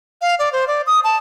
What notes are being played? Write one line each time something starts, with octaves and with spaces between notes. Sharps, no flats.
F5
D5
C5
D5
D#6
A5